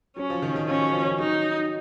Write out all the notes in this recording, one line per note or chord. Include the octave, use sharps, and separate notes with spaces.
F#3 C#4
F3
D#3
D#3
F3 C#4
F#3
F3
F3
F#3 D#4